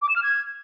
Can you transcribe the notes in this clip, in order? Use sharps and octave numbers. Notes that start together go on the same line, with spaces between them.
D6
E7
F6
G#6